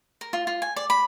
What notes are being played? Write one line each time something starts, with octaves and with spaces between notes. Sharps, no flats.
A#4
F4
F4
G#5
D5
B5